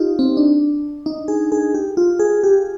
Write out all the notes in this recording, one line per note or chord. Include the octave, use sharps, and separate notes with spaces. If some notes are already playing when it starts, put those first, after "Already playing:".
Already playing: D#4 F4 G4
C4
D4
D#4
G#4
G#4
G4
F4
G#4
G4